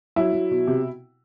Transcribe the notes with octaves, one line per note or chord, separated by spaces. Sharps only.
F#3 E4
F#3
B2
C3